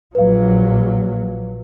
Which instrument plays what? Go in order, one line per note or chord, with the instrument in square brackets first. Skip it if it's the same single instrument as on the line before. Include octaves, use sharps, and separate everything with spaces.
[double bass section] A#1 A#2 F#3 [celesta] B4 F5